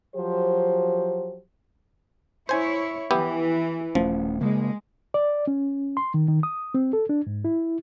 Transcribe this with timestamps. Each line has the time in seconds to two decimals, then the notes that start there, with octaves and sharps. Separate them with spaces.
0.15 F3 F#3 G4 C5
2.49 E4 C5 C#5 G#5
3.11 E3 B3 E4 G4
3.95 D#1 F3 A3 C#4
4.41 C#3 G#3 A#3
5.14 D5
5.47 C#4
5.97 C6
6.14 D#3
6.29 D#3
6.43 D#6
6.74 C4
6.93 A4
7.09 D4
7.27 G#2
7.45 E4